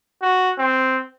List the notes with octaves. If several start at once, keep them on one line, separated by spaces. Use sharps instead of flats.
F#4
C4